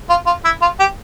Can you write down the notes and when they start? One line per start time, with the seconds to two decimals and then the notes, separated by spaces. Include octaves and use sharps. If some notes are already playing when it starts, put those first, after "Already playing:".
0.10 F4
0.26 F4
0.44 E4
0.61 F4
0.79 G4